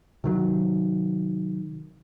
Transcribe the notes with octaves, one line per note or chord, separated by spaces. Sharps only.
C3 D#3 F#3